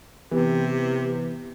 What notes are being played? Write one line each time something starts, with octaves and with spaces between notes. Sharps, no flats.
C3 E3 B3 G4